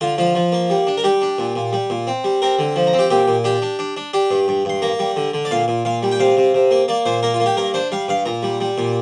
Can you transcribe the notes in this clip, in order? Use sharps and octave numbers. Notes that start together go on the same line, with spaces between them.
D3 F4
F3 F4
F3
A#3
G3
D4
A#4
G3 G4
D4
A#2
A#2
G3
A#2
C4
G3
C4 A#4
D3
F3
A#5
C4
G4
A#2 G4
A#2
D4 G4
D4
D4
D4
D4 G4
G2
G2
G2 C6
A#3 A#5
G3
D3
D3
D5
A#2 F5
A#2
A#2 F5
G3
G5
C3 F5
C3
C3
A#3
A#3 D5
A#2 C5
A#3 A#4
F4
A#3
G4
G2 A#4
D4 C5
G3 F5
G2 F5
A#2 A#5
G3
G3
A#2